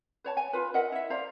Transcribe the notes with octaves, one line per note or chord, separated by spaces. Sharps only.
B4 C#5 A5
G#5
F4 B4
A#4 D#5 E5 F#5
E4 E5
C5 D5 F5 A#5